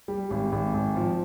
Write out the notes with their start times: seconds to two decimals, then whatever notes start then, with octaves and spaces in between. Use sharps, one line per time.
0.08 G3
0.30 G#1
0.52 G#1
0.74 G#1
0.96 F3